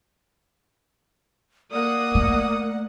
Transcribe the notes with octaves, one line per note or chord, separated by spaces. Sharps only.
A#3 D5 F#5 D#6
A3